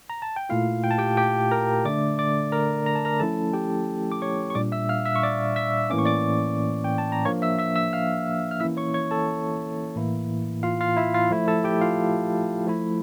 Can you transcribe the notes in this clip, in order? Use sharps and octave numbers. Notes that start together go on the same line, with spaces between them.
A#5
A5
G5
A#2 A3 E4 F4 F5
G5
A5
G4 G5
G4 G5
A#4 A#5
D3 A3 D4 D5 D6
D5 D6
A#4 A#5
A#5
A5
A#4 A#5
F3 A3 C#4 E4 A4 A5
G4 G5
D6
C#5 C#6
C#6
A#2 G3 D4 D5 D6
E5 E6
F5 F6
E5 E6
C#6
D5 D6
E5 E6
A2 E3 A#3 C#4 D6
C#6
D5 D6
G5
A5
A#5
F3 A#3 D4 C#5 C#6
E5 E6
E5 E6
E5 E6
F5 F6
F6
E3 A#3 C#4 E4 E5 E6
C#5 C#6
C#5 C#6
A4 A5
A2 E3 A#3 E4
F4 F5
F4 F5
E4 E5
F4 F5
F3 A3 E4
A4 A5
G4 G5
F4 F5
F3 A3 E4